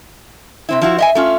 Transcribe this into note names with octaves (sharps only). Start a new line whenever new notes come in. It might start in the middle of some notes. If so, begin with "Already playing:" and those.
C3 C4 E4
F3 E4 F#4
D#5 E5 G#5
A3 C#4 F4